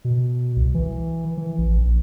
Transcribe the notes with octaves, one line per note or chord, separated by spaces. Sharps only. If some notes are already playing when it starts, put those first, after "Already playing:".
B2
C2
E3
E3
A1
A#1